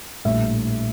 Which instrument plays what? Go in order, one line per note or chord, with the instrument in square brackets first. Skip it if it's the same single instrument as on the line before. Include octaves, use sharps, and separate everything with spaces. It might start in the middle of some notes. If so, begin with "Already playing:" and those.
[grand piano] A#1 A2 G3 E5